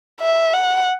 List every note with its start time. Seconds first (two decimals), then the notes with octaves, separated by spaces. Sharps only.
0.21 E5
0.53 F#5